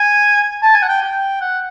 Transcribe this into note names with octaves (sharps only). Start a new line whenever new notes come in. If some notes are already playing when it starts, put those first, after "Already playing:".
Already playing: G#5
A5
G#5
F#5
G5
G5
F#5